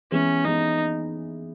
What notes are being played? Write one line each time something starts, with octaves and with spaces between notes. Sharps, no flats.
E3 G#3 B3 C#4
E3 G#3 B3 D#4